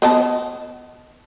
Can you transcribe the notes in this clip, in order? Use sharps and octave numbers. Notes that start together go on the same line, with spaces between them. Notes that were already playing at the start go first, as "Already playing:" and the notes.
B3 D#5 A5